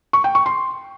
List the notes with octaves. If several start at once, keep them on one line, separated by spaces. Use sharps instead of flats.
C#6
G5
C#6
C6